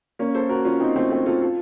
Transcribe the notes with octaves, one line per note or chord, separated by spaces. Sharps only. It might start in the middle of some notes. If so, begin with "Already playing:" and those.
A#3 C#4
A4 C5
F#4 A#4
C#4 F4
C4 D#4
A3 C4
A3 C4
F4 A4
F4 A4